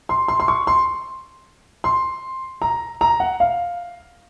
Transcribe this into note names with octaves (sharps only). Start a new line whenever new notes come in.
C6
C6
C6
C#6
C6
C6
A#5
A#5
F#5
F5